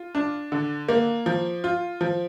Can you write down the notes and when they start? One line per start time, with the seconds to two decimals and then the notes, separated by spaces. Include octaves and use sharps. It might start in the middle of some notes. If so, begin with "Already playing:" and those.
Already playing: F4
0.15 D4
0.52 D3
0.89 A#3
1.26 F3
1.64 F4
2.01 F3